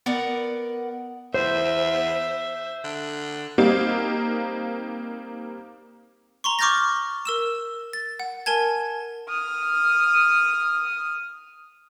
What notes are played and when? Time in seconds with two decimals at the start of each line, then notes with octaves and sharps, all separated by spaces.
0.06 B3 A#4 D5 F#5
1.34 E2 C5 E5
2.84 D3
3.58 G3 A#3 C4 D#4 G4 F5
6.44 A#5 C6 C#6
6.59 C#6 D6 F6 G6 A6 A#6
7.25 A#4 E6 E7
7.93 A6
8.20 F#5
8.46 A#4 G#5 A5 G#6
9.29 D#6 F6